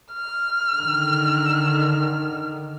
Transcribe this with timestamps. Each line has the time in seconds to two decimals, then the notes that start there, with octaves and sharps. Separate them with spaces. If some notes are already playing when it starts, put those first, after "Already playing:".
0.12 F6
0.76 D3 D#3